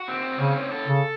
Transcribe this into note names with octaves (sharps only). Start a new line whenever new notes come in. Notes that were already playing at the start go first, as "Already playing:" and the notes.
Already playing: F#4
C4
C#3 C#4
A4
C#3